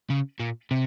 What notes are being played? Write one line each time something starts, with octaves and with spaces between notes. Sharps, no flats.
C#3
A#2
C3